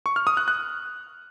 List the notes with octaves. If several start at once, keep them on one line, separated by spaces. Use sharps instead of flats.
C#6
F6
D#6
F#6
F#6